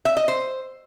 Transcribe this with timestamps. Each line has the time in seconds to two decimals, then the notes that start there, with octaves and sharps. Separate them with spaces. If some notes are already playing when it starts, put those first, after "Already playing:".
0.05 E5
0.17 D#5
0.28 C5